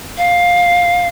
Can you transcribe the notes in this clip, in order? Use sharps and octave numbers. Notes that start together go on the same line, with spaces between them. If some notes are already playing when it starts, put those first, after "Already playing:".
F5